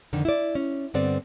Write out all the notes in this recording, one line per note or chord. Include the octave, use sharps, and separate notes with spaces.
F2 D3 D#3
E4 D5
C#4
G2 D3 B3 C4 D5